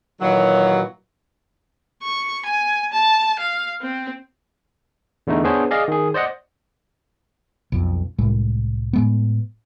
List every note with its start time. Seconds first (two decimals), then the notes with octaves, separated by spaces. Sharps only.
0.21 A#2 D#3 E3 F#3
2.03 C#6
2.45 G#5
2.92 A5
3.39 F5
3.81 C4
5.27 E2 D3 A3 D#4
5.44 B3 D4 G#4 C5 C#5
5.71 G#4 D5 D#5 F5
5.88 D#3 G#4
6.14 C5 D5 D#5 F#5
7.72 B1 F2
8.18 C2 A2 G#3
8.93 A2 G#3 B3